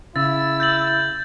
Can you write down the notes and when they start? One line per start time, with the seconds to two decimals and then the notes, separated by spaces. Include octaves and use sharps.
0.16 C#3 E4 E6 A6
0.60 G6 A6 F#7